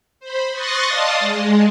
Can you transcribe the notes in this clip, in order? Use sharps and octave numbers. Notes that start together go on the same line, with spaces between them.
C5 B5
C6 C#6 D#6 F#6 A6 A#6
D5 D#5 F5 A5 C6 D#6
G#3